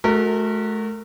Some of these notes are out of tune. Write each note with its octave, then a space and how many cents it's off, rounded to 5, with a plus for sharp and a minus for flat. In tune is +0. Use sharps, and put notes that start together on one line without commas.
A3 -40 F#4 +0 A#4 -30